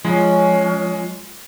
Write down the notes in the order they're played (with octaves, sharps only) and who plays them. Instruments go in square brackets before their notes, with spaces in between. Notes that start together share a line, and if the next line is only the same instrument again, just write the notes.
[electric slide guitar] F3 [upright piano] G#3 [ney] C#4